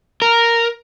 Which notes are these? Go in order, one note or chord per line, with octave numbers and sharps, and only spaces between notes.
A#4